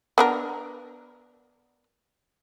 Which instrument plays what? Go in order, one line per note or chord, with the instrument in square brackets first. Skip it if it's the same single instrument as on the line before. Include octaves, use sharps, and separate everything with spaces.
[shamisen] B3 D4 A#4